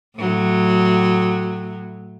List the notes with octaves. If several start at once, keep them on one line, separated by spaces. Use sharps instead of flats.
A2 F#3